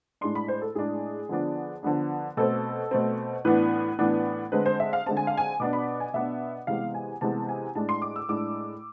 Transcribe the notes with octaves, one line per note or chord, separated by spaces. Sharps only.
A2 G#3 D4 C6
B5
C5
A4
A2 G#3 D4 G#4
D3 F3 B3 D4
D3 F3 B3 D4
B2 A3 C4 A4
B2 A3 C4
A2 E3 B3 D4 B4
A2 E3 B3 D4
D3 G#3 C4 B4
C5
E5
F5
D3 G#3 C4 A5
G#5
F5
G#5
B2 B3 D4 D6
B5
G#5
B2 B3 D4 E5
C3 E3 G#3 B3 F5
G#5
C3 E3 G#3 B3 A5
G#5
A2 G#3 D4 A5
C6
D6
E6
A2 G#3 D4 D6